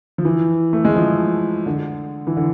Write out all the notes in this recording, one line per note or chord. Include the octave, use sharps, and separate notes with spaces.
F3
E3
A3
G#3
F3
D3
E3
D3